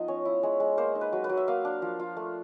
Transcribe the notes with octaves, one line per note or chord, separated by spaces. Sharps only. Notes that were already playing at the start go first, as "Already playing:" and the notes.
Already playing: F3 B3 D#4 D#5
C#4 C#5
E4
G#3 C#5
G#3
A#3 C5
D#4
B4
F#3
B4
F#3
E5
A#3 F5
D4
F3
F4
A3